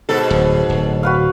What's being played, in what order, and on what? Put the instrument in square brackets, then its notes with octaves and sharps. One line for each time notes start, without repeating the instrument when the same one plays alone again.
[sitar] G#2 B2 A4
[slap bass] D1
D1
[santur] F#4 B4 F5